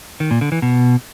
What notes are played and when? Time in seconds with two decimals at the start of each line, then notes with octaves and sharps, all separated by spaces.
0.20 D#3
0.31 A#2
0.41 D3
0.52 E3
0.62 B2